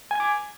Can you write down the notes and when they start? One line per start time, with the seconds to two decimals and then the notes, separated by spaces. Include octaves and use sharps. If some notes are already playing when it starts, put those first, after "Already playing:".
0.11 G#5
0.15 G#6
0.20 D6